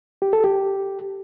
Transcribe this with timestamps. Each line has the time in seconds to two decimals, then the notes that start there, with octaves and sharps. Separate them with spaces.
0.22 G4
0.33 A4
0.44 G4